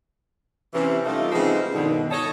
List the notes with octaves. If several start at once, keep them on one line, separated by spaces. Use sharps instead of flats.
C3 E3 C#4
G3 A3 A#3 D#4 F4
C#3 F3 G#3 B3 C4 D#4
G2 B2 D3 D#3
A4 C#5 D#5